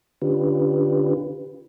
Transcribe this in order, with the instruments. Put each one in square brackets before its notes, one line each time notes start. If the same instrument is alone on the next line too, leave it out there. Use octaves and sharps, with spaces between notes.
[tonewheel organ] D3 C#4 D4 F4 G4 B4